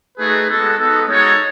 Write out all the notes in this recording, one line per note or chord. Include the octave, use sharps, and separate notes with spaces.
A3 D#4 F#4 G#4 B4
G#3 B3 F#4 A4
B3 D#4 F#4 A4
G#3 D#4 F#4 A4 C#5